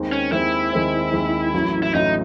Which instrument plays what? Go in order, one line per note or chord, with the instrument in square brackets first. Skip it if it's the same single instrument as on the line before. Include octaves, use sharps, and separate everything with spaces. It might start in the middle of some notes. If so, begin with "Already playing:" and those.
Already playing: [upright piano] D#2 D#3 G#3 C4
[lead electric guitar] C#4
[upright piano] D#2 D#3 G#3 C4 [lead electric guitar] E4
[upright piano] D#2 D#3 G#3 C4
D#2 D#3 G#3 C4
A1 A2 F#3
[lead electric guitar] E4
[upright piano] A1 A2 F#3 [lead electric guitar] D#4